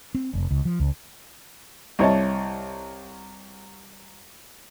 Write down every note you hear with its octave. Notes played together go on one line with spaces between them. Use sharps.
C4
F1
C#2
F3
C#2
C2 E4 C#5 D#5 A5